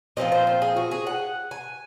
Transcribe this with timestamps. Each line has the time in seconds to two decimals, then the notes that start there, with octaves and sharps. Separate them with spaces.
0.17 A#2 F3 C4 F4 D#5
0.32 C5
0.47 C5
0.62 G#4
0.76 F#4
0.91 G#4
1.07 F#5
1.51 G#5